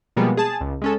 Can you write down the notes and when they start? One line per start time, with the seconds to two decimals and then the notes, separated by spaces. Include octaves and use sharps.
0.16 B2 F3 G3 G#3 A#3 B3
0.37 G#4 A5
0.61 C#2
0.82 G#3 C#4 A4